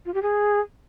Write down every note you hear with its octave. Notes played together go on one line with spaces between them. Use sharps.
F4
G4
G#4